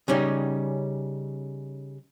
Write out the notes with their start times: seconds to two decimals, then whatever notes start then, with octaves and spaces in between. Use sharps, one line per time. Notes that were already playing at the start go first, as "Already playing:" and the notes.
0.08 C#3 G3 C#4 D#4 G4